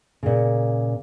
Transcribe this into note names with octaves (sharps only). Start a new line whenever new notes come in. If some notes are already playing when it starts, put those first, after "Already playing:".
A#2 C#3